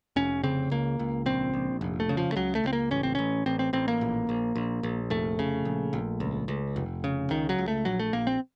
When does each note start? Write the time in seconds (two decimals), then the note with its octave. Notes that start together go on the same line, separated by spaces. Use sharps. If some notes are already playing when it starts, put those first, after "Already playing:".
0.16 F1 C#4
0.44 C#3 C4
0.71 C#2 A#3
0.99 C#2
1.26 A#1 C4
1.54 A#1
1.81 F1
2.00 A3
2.09 C#3
2.17 F3
2.32 A3
2.36 C#2 F#3
2.55 A3
2.64 C#2 C4
2.73 A#3
2.91 A1 C#4
3.03 C4
3.15 A1 C#4
3.46 A1 C4
3.59 C4
3.73 A1 C4
3.88 A#3
4.01 A#1
4.29 A#1
4.56 A#1
4.83 A#1
5.10 F1 A3
5.39 C#3
5.65 A#1
5.93 A#1
6.20 C#2
6.48 C#2
6.76 F1
7.04 C#3
7.30 C#2 D#3
7.49 F#3
7.58 C#2
7.68 A3
7.85 A#1 F#3
8.00 A3
8.13 A#1 A#3
8.27 C4